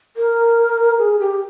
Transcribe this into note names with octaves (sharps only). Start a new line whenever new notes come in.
A#4
G#4
G4